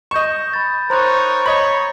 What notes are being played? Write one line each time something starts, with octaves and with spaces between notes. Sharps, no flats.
D#5 C#6 G6 E7
B5 A6
D#4 A#4 C5 C#5 A#5 C6 F#6 A6
C#5 D#5 B5